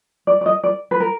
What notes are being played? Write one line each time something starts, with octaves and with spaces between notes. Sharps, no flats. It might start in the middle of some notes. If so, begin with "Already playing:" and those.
D5
D5
D#5
D5
B4
A#4